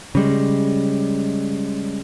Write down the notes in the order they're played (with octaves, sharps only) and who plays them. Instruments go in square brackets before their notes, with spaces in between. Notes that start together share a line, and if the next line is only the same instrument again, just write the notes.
[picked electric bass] C#3 G3 G#3